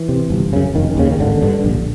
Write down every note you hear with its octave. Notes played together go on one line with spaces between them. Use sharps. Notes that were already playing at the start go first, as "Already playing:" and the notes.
Already playing: E3
C3
G1
F#2 C#3
F1 D#3
D#2 C#3
D#3
G#1 D3
G2 D3
A#1